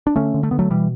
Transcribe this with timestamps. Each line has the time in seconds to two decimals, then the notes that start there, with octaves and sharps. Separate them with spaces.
0.07 D4
0.16 D3 A3 C#4
0.34 D3
0.43 A3
0.51 D3 B3
0.59 F#3 A3
0.70 B2 E3 G3